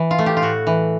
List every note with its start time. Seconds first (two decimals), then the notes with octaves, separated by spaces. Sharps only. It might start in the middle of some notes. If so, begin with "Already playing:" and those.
Already playing: E3
0.11 F4
0.19 A3
0.26 G4
0.37 F4
0.42 A2 F#4
0.67 E3